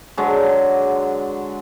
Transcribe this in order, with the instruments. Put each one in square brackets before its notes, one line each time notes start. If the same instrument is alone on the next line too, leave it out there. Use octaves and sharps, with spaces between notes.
[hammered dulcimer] D3 F#3 G#3